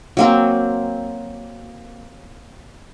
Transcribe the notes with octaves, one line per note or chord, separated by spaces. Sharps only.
F#3 A#3 C4